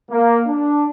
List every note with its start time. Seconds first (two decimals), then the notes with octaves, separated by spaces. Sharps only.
0.11 A#3
0.47 D4